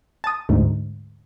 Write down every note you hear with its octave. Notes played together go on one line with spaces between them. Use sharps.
A5 D#6
D2 G#2